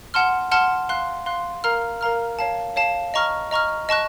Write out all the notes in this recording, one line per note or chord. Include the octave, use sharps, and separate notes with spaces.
F#5 A5 C6 F6
F#5 A5 C6 F6
F5 C6 F#6
F5 C6 F#6
A#4 F5 A#5 F6
A#4 F5 A#5 F6
C#5 F5 A5
C#5 F5 A5
D#5 A#5 C#6 F6
D#5 A#5 C#6 F6
D#5 A5 C#6 F#6